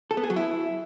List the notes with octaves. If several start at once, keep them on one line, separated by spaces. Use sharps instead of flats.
A4
B3
G#4
F#3
E4